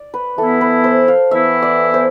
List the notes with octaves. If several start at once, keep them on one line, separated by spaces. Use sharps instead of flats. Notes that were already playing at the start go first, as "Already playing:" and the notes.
Already playing: D5
B4
E3 B3 E4 A4
B4
C5
F5
E3 B3 E4 E5
D5
C5